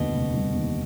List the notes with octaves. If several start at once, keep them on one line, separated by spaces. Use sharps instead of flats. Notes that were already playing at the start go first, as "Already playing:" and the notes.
Already playing: F1 D#2 B2 D3 G3
F1
G3
D#2